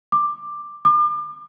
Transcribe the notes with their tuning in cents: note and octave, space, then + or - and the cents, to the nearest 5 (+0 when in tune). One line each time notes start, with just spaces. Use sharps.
D6 +10
D6 +35